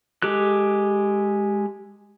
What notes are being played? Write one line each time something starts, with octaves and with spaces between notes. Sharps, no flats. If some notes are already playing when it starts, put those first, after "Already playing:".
G#3 G4 A4 F#6